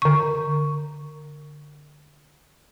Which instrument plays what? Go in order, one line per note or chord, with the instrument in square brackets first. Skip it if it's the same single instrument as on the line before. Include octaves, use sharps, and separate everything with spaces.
[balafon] D3 C#6